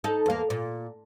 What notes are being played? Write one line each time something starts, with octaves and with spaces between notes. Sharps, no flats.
D#4 A4
E2 A#3
A#2